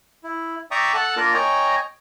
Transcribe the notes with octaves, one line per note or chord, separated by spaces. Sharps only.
E4
D5 E5 G5 A#5 C#6 D#6
A4 F#5 A5
A#3 D4 F4 A#4
C#5 D#5 G5 G#5 A#5